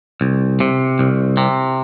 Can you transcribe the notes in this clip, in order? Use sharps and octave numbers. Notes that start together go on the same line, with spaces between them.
C2
C3
C2
C3